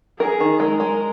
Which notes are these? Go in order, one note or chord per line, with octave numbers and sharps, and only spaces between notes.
G#4 A#4
D#3
G#3 A#4
G#3